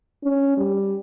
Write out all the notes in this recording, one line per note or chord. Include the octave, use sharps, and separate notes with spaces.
C#4
G3